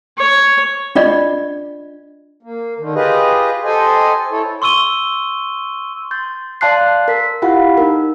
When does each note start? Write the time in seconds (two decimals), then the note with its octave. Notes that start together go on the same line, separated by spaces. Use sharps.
0.17 C#5
0.95 D4 F4 D5 D#5
2.43 A#3
2.79 D3 D#3
2.95 F4 G4 G#4 B4 D#5
3.64 G4 A4 C5 D#5 G#5
4.31 E4 A4 C#5
4.62 C6 C#6 E6 D#7 G7
6.11 C6 G6 A6
6.61 D5 F5 A5 C6 F#6 C7
7.08 A#4 B6
7.42 E4 F4 G4 F5 F#5 B5
7.78 D#4 A#4